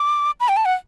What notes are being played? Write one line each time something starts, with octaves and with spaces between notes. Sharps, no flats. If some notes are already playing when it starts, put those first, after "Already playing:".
Already playing: D6
B5
G5
A5
F#5